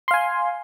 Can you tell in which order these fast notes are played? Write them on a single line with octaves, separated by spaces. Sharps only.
C6 F5 G#5